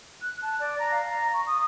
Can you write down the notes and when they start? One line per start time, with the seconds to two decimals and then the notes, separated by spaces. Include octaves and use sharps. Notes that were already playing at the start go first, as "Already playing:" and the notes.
0.22 F#6
0.42 A5
0.60 D5
0.79 A#5
0.91 F5
1.09 A#5
1.34 C#6
1.47 D#6